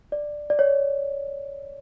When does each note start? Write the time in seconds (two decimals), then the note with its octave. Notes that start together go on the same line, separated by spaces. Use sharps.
0.12 D5
0.50 D5
0.59 C#5